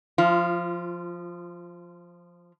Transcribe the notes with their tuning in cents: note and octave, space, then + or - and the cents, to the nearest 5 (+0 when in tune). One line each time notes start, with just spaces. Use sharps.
F3 +0 F4 -25